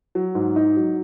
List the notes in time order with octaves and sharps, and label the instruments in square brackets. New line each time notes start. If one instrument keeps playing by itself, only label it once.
[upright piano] F#3
G#2
D#4
F#3